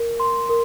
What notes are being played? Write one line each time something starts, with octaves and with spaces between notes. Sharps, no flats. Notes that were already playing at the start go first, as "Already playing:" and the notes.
Already playing: A#4
C6
A#4